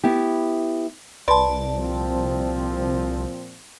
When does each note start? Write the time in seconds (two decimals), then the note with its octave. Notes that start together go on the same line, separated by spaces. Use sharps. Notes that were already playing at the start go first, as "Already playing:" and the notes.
0.04 B3 E4 G4
1.28 C2 B4 D5 A5 B5 C6
1.77 A#2 F3 C4